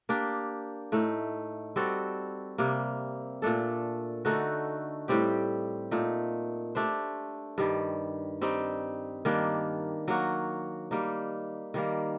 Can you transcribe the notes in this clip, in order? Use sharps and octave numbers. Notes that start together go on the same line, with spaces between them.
A#3 D4 G4
A2 A3 D#4
G3 C4 F#4 A4
C3 G3 A#3
A#2 A3 D4 A4
D3 A3 D#4 F#4
A2 G3 C4 G4
A#2 A3 D#4
A3 D4 G4 C5
G2 D#3 G3
G3 C4 D#4
D#3 G3 A#3 D4
F#3 A#3 F#4
G3 A#3 D#4
D#3 G3 A#3